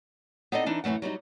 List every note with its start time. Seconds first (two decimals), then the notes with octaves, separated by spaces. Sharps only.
0.52 B3 C4 D#4 A4 D5 D#5
0.66 E3 D4 D#4
0.84 F#2 E3 G#3 A3 F#5
1.02 F#3 G3 B3 D#4